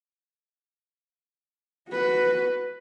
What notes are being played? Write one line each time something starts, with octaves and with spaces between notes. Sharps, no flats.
F#4 B4